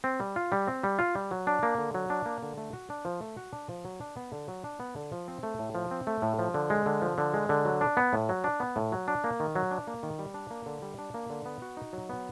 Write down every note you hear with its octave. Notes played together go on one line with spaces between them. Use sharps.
C4
G3
F4
G3
C4
G3
F4
G3
F#3
D4
A#3
D3
F#3
D4
A#3
D3
A3
F#4
D4
F3
A3
F#4
D4
F3
F#3
D4
B3
D3
F#3
D4
B3
D3
F3
C4
A3
A2
F3
C4
A3
A2
F3
D3
G#3
D3
F3
D3
G#3
D3
F#3
D4
B3
A2
F#3
D4
B3
A2
F#3
D4
A#3
D#3
F#3
D4
A#3
D#3
G3
D4
A#3
D3
G3
D4
A#3
D3
B3
F#4
D#4
F#3
B3